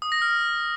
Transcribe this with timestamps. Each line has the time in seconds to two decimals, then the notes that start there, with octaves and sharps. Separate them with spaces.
0.02 D#6
0.12 A#6
0.22 F6